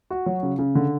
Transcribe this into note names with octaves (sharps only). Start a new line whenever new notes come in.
F#4
F#3
C#3
C#3
D3